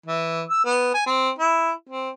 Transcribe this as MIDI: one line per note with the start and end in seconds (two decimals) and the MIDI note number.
0.06 0.42 52
0.49 0.61 88
0.65 0.90 59
0.94 1.02 80
1.06 1.30 60
1.38 1.72 64
1.89 2.09 60